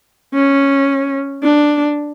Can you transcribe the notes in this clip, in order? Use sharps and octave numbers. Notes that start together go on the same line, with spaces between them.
C#4
D4